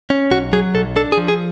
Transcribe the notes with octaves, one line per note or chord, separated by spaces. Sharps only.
C#4
B1 F#4
F#3 G#4
B1 A4
D4 A4
G#4
F3
G#4